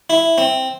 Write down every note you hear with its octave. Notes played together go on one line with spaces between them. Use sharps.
E4
C4